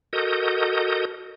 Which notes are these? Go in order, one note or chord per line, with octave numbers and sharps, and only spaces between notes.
F#4 A4 A#4 D#5 D#6 G6